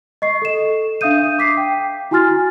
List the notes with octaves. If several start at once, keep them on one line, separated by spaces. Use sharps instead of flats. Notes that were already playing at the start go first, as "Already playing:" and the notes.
D#5 C#6 C7
A4 E7
D4 E5 F5 D#6 G6 D#7
D6 B6 C7
G5
E4 F#4 G#5 C6 F6 A6